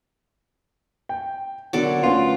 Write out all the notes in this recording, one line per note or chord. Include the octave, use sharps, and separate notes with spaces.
G5
B2 D3 F#3 A4 A#4 D5
D2 C#4 F4 B4